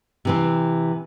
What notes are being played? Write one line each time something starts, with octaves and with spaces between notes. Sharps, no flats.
C3 E3 C4